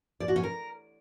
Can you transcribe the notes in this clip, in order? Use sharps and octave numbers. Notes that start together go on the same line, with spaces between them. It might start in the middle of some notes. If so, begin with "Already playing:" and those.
D5
F#4
C#4
A#4